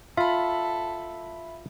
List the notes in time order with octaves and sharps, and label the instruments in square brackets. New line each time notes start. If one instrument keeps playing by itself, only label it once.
[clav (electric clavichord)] F4 [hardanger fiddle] A4 [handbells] E5 B5